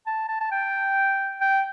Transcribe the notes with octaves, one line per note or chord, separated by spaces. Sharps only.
A5
A5
A5
G5
G5